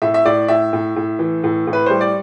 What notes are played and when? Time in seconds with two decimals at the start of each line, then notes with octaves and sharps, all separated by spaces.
0.02 A2 E5
0.14 E5
0.25 A2 D5
0.48 A2 E5
0.73 A2
0.96 A2
1.19 E3
1.44 A2
1.67 A2
1.73 B4
1.86 G3 C5
2.01 D5